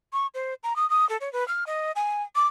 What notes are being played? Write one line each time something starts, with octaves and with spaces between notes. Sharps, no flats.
C#6
C5
A#5
D#6
D#6
A4
C#5
B4
F6
D#5
G#5
D6